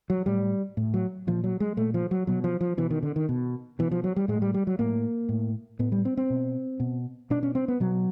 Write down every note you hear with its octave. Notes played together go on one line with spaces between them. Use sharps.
F#3
A2 G3
A2
F#3
A#2 F3
F#3
G#3
A#2 A3
F3
F#3
B2 F#3
F3
F3
B2 E3
D#3
D3
D#3
B2
B2 E3
F3
F#3
G3
A2 G#3
G3
G3
F#3
A2 A#3
A2
A2 B3
G3
C4
C4
B2
B2
B2 D4
C#4
C4
B3
B2 F#3